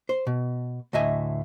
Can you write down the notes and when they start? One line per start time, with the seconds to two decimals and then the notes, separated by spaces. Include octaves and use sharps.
0.09 C5
0.27 B2
0.93 D2 A2 D#5 E5 G#5